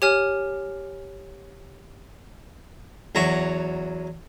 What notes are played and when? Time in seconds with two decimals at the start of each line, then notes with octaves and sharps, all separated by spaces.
0.02 G4 C#5 G#5 F6
3.15 E2 F#3 A#5 C#6